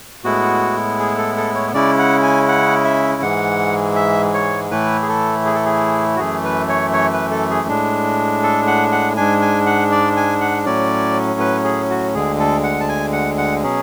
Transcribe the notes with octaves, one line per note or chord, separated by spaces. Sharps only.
A2 G#3 B3 E4 F#4
G#4
A4
A4
C#5
C#3 G#3 C#4 E4 D5
F#5
G#5
F#5
E5
G#2 E3 G#3 F#5
E5
C#5
A2 E3 A3 E4 B4
G#4
A4
G#4
A4
G#4
F#4
F#2 E3 A3 G#4
B4
C#5
C#5
B4
A4
G#4
A2 G#3 D4
A4
F#5
F#5
G#2 G#3 D4 G#5
G#5
F#5
D5
G#5
F#5
A2 F#3 C#4 D5
B4
G#4
F#4
D2 D3 G#3 G#4
A4
F#5
A5
G#5
F#5
F#5
B2 F#3 C#4 G#4